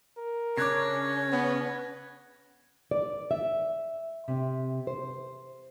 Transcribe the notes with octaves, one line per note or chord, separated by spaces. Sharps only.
A#4
C#3 C#4 D4 D6 F#6 G#6 A#6
B3
D5
E5
C3
C5